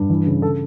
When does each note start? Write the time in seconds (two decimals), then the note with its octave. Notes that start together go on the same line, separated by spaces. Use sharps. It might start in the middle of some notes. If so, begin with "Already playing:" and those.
Already playing: G2
0.10 E3
0.26 C#3
0.42 C#3 A4